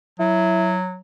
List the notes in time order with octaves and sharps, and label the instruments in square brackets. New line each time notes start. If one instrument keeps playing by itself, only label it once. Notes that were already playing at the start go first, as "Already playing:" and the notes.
[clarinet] F#3 [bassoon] E4